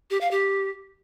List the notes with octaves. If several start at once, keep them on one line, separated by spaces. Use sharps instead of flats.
G4
F5
G4